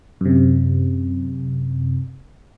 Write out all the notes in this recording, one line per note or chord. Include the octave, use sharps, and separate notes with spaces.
F#2 C3